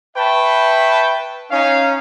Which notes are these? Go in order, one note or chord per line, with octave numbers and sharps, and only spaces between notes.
B4 E5 G5 A5 B5 C#6
C#4 D#4 F5